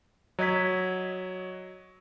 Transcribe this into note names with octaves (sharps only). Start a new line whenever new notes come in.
F#3 D#5 G#6 B6